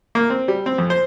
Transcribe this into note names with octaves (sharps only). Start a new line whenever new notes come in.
A#3
C4
G3
C4
F2
C5